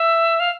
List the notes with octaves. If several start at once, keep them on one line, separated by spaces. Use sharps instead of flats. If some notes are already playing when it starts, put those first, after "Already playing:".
Already playing: E5
F5